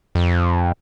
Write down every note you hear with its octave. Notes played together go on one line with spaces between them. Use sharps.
F2